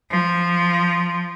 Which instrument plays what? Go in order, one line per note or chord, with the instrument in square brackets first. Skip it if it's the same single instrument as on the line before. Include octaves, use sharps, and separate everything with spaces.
[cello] F3